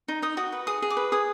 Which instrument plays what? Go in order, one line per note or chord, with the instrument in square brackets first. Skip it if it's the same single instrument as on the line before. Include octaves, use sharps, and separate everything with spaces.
[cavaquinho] D#4
D#4 D#6
F#4 D#6
B4
G#4 D#6
G#4
D6
B4
G#4 D#6